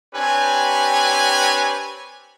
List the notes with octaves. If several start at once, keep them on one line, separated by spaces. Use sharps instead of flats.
C4 D4 G4 B4 C#5 G#5